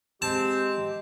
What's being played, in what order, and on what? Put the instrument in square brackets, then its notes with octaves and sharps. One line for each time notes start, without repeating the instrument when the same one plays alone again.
[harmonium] G#3 G4 [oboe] C4 [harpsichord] A5